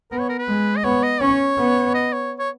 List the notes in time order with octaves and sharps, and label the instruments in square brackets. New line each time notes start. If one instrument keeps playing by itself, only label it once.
[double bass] B3 [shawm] A#4
[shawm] C#5
A#4
B4
[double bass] G#3
[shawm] D#5
[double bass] B3 [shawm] C#5
[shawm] D#5
[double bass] C#4 [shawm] C#5
[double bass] B3
[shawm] D#5
C#5
C#5